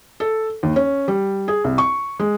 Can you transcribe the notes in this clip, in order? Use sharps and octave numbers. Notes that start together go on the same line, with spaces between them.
A4
D#2
C#4
G3
G#4
C2
C#6
G#3